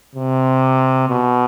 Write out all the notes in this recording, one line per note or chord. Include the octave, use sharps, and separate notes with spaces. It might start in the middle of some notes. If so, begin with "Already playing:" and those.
C3
B2